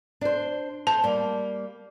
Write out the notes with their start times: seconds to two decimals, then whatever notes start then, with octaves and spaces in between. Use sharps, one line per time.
0.21 D4 C5
0.87 C5 A5
1.04 G3 A#3